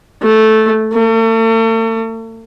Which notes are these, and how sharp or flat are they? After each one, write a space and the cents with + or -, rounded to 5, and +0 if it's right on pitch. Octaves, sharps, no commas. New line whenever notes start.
A3 -5
A3 +40